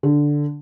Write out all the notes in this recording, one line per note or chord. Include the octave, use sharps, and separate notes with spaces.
D3